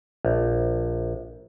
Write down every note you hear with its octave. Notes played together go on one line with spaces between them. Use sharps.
A#1